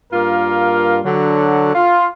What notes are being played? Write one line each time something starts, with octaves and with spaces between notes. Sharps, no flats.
G2 A#3 F4 A#4
D3 F#3
F4